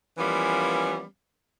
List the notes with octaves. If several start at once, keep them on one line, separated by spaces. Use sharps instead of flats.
E3 F3 G3 A#3 B3 C#4